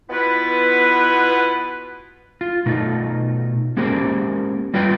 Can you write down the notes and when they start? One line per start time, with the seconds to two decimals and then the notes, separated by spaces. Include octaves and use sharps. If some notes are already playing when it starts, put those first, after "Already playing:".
0.10 B2 B3 E4 F4 B4
2.41 F4
2.66 B2 A3 D#4 F4
3.77 G#3 A#3 C#4 G4 A#4 C5
4.74 G3 F4 B4 C#5 G5